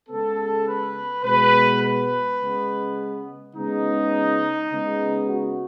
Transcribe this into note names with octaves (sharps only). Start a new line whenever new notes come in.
C#3 G#3 B3 A4
B4
B2 G#3 B3 B4
B4
C#3 G#3 B3
C#3 G#3 B3 D#4
C#3 G#3 B3
F#4